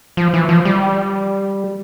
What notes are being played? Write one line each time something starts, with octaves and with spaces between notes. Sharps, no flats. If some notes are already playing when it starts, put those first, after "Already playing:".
F3
E3
F3
G3